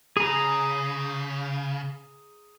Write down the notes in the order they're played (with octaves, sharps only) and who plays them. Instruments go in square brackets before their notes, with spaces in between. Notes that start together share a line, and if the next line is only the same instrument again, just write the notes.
[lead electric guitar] C#3 [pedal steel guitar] G#4 A#5